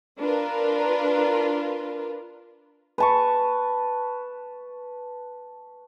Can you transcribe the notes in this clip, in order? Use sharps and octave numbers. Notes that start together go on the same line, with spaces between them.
D4 F4 A#4 B4
B4 A5 C#6